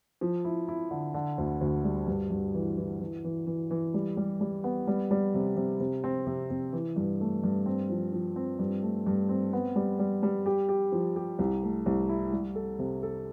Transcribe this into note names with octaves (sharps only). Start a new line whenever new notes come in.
F3
E4
E4
D3
D3
D2
D2
G3
G2
G2
E3
E3
E3
E3
E3
E3
G3
G3
G3
B3
G3
G3
C3
C3
C3
C4
C3
C3
E3
G2
A3
G2
C4
F3
F3
C4
G2
A3
G2
C4
B3
G3
G3
G3
G4
G4
F3
G4
C2
A3
C2
E4
G3
A4
C3
A4